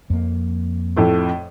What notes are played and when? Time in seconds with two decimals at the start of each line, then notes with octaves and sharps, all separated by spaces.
0.10 F2 A#3
0.96 F2 A2 A3